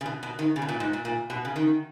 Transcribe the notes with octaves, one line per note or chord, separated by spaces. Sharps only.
C#3
B2
B2
D#3
C#3
B2
A#2
G#2
A#2
A#2
B2
C#3
D#3